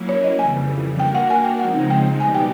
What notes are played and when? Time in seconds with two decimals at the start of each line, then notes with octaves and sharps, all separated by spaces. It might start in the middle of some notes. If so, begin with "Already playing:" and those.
Already playing: F#3 A#3 C#4 E4
0.09 C#5
0.24 D#5
0.39 F2 C#3 E3 G3 G#5
0.99 A#3 D4 F#4 A#4 G5
1.15 F#5
1.30 G#5
1.44 G5
1.59 C#3 F3 G#3 C4 D#4 F#5
1.90 G5
2.19 B2 G3 B3 D#4 G4 G#5
2.35 G5